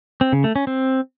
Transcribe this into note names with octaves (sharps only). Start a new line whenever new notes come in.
C4
C#3
A3
C#4
C4